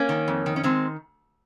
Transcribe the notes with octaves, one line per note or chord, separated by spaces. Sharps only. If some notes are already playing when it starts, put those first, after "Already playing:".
Already playing: A#3 C#4
D#3
F2
D#3
C#4
D#3 G#3 C4